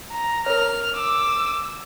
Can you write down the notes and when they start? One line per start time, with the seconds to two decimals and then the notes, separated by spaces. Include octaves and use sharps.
0.12 A#5
0.46 A#4 C#5 F6
0.95 D6 E6